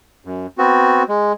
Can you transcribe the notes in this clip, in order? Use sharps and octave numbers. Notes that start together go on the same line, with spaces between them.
F#2
B3 C4 F#4
G#3